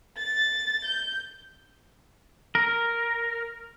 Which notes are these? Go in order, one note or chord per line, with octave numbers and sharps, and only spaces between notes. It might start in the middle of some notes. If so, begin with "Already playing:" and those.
A6
G6
A#4